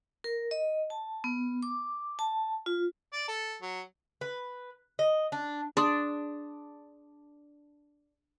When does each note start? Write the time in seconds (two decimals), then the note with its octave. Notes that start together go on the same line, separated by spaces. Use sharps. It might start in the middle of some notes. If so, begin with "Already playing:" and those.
0.24 A#4
0.51 D#5
0.90 A5
1.24 B3
1.63 D6
2.19 A5
2.66 F4
3.13 D5
3.28 A4
3.61 F#3
4.21 B4
4.99 D#5
5.32 D4
5.77 D4 G#4 C6 D#6